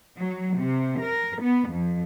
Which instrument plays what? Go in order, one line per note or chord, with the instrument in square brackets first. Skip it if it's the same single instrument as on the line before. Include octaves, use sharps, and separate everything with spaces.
[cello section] F#3
C3
A#4
B3
F2